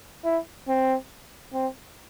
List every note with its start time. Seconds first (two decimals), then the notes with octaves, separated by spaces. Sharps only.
0.24 E4
0.68 C4
1.54 C4